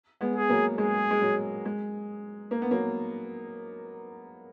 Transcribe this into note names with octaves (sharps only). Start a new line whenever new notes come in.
G#3 B3
G#4
F#3 A#3
G#3 G#4
G#3
F#3
G#3
A#3
B3
F#3 A#3